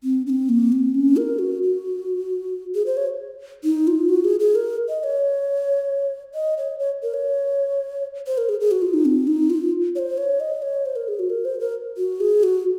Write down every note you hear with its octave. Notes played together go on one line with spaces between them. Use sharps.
C4
C#4
C4
A#3
C4
C#4
A#4
F#4
F#4
G#4
C5
C#5
D#4
F4
F#4
G#4
G#4
A#4
D#5
D#5
C#5
D#5
C#5
C#5
A#4
C#5
C5
A#4
G#4
G#4
F#4
F4
D#4
C4
D#4
F4
C#5
C5
C#5
D#5
C#5
C5
A#4
G#4
F#4
A#4
C5
A#4
F#4
G#4
F#4